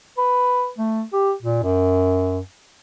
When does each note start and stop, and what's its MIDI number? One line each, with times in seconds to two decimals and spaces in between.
0.18 0.70 71
0.78 1.03 57
1.13 1.31 67
1.43 1.61 46
1.63 2.40 42